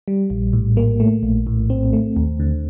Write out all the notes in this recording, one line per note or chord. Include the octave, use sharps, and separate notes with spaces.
G3
A#1
A2
A#3
A3
A#1
A2
C4
A3
D#2
D3